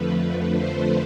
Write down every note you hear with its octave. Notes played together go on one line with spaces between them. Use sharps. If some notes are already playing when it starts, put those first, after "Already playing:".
Already playing: F2 D3 F3 A3 B4
C5